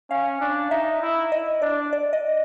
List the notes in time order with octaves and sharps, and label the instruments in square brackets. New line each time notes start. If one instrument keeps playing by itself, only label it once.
[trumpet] C#4 [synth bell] F5
[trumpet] D4
[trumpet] D#4 [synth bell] E5
[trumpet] E4
[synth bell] D#5
[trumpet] D4 [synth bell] D5
[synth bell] D5
D#5